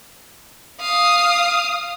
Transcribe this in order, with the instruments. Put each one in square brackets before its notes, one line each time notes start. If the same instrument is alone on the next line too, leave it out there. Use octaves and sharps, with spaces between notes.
[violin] F5 D#6